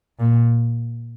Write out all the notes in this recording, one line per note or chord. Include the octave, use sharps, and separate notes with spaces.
A#2